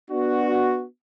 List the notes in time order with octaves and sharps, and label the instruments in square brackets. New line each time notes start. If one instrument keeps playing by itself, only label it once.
[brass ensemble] B3 D4 F#4